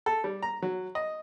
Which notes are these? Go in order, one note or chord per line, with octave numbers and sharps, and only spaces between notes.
A4
G3
A#5
F#3
D#5